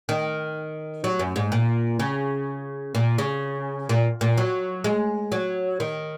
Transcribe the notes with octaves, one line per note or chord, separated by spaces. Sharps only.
D#3
F#3
F#2
G#2
A#2
C#3
A#2
C#3
A#2
A#2
F#3
G#3
F#3
D#3